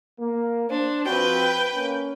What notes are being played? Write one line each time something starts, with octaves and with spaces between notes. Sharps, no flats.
A#3
D4 C5
F3 C4 F#4 B4 G5
A#3 C#4